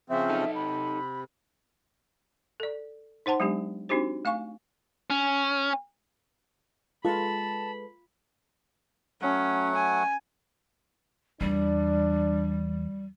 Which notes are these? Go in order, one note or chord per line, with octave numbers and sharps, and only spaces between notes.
C#3 F3 C4 E5
D#4 A4
C3 B5
A4 D5
D#4 C5 F#5 A5 C6
F#3 G#3 B3 D4 G4
C4 D4 D#4 F#4 G4 C5
A3 F5 G#5 C#6
C#4
G#3 F4 A4 B4 A5 B5
F#3 A3 C#4 F#5
G#5
E2 G3 D4